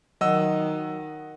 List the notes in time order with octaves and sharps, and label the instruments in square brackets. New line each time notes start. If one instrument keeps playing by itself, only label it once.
[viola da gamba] D#3 [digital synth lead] F#3 [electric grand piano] D#5 F#5 E6